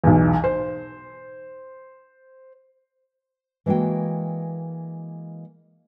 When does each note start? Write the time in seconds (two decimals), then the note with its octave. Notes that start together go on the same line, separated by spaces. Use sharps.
0.04 B1 E2
0.44 C5
3.66 E3 G#3 A#3 F#4 G5